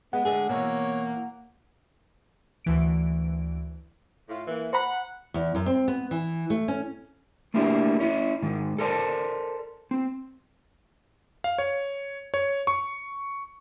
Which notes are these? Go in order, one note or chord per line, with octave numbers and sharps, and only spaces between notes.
G#3 B3 F#5
D3 G#3 A3 G#4
B2 E3 A#3 C#5
D2 E3 D7
A2 F4
E3 A#3
C5 F#5 A#5 B5
E2
F#2
C4
B3
E3
A3
C#4
A3 A#3 D4 E4 G4
C#4 E4
G#2 D#3
A4 A#4 C5 D5 A5
C4
F5
C#5
C#5
C#6